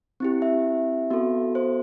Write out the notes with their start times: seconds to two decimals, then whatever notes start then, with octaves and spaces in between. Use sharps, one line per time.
0.20 C4 E4 G4
0.42 E5
1.10 B3 F#4 A4
1.55 C5